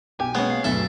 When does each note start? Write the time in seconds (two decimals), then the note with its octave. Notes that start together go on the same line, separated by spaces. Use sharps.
0.20 B1 G4 G#5
0.35 G#3 A#3 B3 C#4
0.50 F5
0.64 G1 D2 B2 F#3 A4 E5